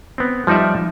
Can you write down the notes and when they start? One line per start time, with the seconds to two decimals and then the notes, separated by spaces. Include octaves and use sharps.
0.18 B3 C4
0.47 F3 G3 D#4 D5 E5